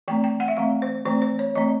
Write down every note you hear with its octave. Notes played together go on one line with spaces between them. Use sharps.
E3 A3 C4 G5
G5
F#5
E5
E3 A3 C4 F5
C5
E3 A3 C4 C5
C5
C#5
E3 A3 C4 D#5